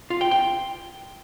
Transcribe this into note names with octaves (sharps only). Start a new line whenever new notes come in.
F4
G5
G5